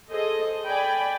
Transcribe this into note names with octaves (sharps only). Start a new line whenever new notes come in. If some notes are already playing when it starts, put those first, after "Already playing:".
G#4 A4 C5 D#5
D5 G5 G#5 B5